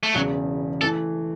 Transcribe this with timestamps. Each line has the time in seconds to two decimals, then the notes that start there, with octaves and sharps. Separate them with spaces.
0.03 A3
0.14 E1 E2 C#3 F#3
0.81 E3 A3 A4